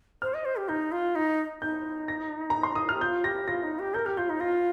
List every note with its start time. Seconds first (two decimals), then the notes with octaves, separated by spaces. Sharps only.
0.22 C5 F6
0.34 D#5
0.45 C5
0.56 G4
0.69 D#4 G6
0.92 F4
1.15 D#4
1.62 D#4 G6
2.08 A#6
2.50 A#5
2.63 C6
2.75 D#6
2.89 G4 F6
3.01 F4 G6
3.24 G4 A#6
3.48 F4 A#6
3.63 D#4
3.79 G4
3.94 A#4 G6
4.06 G4 F6
4.17 F4 G6
4.30 D#4
4.40 F4 A#6